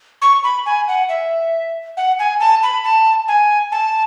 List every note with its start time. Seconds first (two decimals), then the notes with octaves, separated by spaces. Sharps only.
0.22 C#6
0.44 B5
0.66 G#5
0.88 F#5
1.09 E5
1.97 F#5
2.19 G#5
2.40 A5
2.63 B5
2.84 A5
3.28 G#5
3.72 A5